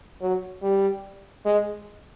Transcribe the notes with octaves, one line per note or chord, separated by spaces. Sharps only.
F#3
G3
G#3